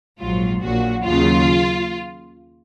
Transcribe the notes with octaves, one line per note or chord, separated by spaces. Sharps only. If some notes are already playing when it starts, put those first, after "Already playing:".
A#1 G#2 F#3 F4
A#1 A#2 F#3 F#4
D#2 C#3 F#3 F4